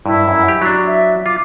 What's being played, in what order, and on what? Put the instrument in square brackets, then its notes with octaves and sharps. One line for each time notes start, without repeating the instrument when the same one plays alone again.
[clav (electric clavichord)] G2 [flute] E4
[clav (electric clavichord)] F#2
G4
F#3 D4
[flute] E5
[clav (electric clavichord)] F4 [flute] D6